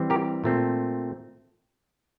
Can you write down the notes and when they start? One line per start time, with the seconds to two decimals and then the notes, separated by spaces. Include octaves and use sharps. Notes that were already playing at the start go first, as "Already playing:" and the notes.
Already playing: E3 G3 C4
0.10 G4 A#4
0.44 A#2 A3 C4